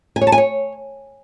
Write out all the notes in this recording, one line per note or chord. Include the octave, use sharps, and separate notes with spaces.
G#5
C#5
A5
G#5
C#5